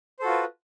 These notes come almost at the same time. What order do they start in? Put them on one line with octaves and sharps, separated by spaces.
C5 A4 F#4 F4 B4